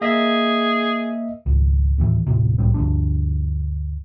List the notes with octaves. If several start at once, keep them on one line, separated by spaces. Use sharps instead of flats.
A#3 G#4 D#5 E5
G#1 C#2
D#2 A2 E3
D#1 A2 C3
C2 A2 G3 C4
D2 G2 G#3 D4